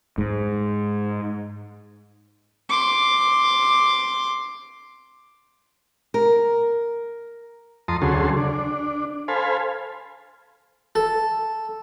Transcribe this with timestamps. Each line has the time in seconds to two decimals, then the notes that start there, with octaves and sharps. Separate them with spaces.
0.18 G#2
2.69 C6 D6
6.14 A#4
7.88 F2 A5 A#5 C6 D#6
8.02 D2 C#3 F#3 G#4 A4 C6
8.37 D4
9.28 A4 C5 F5 G#5 B5
10.95 A4